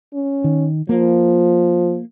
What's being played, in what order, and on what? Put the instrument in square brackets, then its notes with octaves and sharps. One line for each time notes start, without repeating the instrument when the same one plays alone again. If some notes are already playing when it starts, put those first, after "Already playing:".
[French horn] C#4
[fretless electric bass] D#3
[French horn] F3 [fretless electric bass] A#3